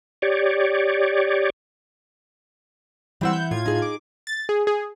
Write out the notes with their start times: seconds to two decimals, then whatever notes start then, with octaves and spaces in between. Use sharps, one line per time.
0.22 G4 C#5 D5
3.21 E3 G3 C4 E4 F#5 E6
3.33 G6
3.51 A2 F4 G#6
3.66 D#4 G#4
3.82 D6
4.27 A6
4.49 G#4
4.67 G#4